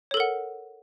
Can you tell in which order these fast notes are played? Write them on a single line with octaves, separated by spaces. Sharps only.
C#5 A4 A#4 F#5